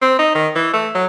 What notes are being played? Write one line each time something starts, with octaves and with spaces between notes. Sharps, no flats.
C4
D#4
D#3
E3
A3
F#3